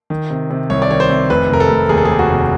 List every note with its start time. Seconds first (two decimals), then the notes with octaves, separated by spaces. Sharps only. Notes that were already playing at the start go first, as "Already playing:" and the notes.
0.10 D#3
0.30 C3
0.50 C3
0.70 C2 C#5
0.82 D5
0.90 D#3 C#5
1.00 C5
1.10 C3
1.30 F1 B4
1.49 F1 A#4
1.60 A4
1.70 F1
1.89 D#2 G#4
1.98 A4
2.05 D#2 G#4
2.19 F#4
2.30 F1